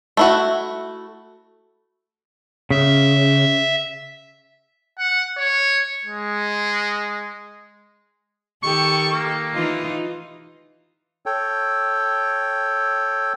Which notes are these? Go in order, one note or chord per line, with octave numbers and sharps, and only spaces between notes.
A3 E4 F#4
C#3 E5
F#5
C#5
G#3
D#3 G4 A4 C#6
A#3
E3 D#4 F4
A4 C#5 G5